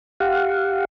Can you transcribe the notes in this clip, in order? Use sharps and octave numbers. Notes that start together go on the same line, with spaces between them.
G4 F5 F#5